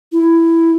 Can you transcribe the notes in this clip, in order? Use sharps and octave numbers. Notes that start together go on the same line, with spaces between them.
E4